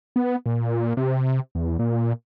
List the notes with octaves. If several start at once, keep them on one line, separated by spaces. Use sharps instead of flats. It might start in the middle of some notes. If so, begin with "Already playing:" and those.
B3
A#2
C3
E2
A#2